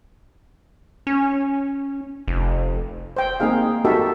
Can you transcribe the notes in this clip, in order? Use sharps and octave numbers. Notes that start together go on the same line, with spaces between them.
C#4
F1
C5 G5
A#3 C4 D#4 G#4 F5
D#4 F#4 G4 A4 A#4 E5